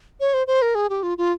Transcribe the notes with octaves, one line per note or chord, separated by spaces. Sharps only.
C#5
C5
C5
A#4
G#4
G4
F4
F4